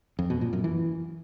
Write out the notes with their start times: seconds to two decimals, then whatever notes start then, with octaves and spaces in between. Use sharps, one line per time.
0.19 F2
0.30 B2
0.41 A#2
0.53 F#2
0.64 E3